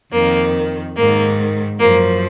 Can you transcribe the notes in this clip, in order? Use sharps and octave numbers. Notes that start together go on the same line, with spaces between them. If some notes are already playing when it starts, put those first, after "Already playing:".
F2 D#3 A#3
G#2 D#3 A#3
F#2 F3 A#3